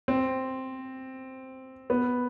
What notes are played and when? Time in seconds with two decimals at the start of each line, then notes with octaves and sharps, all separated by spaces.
0.08 C4
1.90 B3